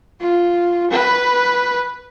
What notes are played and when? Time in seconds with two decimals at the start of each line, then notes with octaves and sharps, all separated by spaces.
0.20 F4
0.91 B4